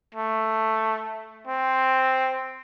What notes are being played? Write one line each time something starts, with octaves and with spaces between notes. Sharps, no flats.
A3
C4